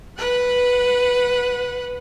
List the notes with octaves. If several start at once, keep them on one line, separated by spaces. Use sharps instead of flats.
B4 F#5